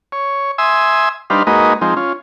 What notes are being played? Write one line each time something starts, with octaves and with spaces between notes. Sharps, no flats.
C#5
E5 G#5 C6 D#6 E6
G3 D4 D#4 B4 C5 F5
G#3 A#3 D#4 F#4 B4 D#5
F3 G#3 C4 D#4
C#4 F4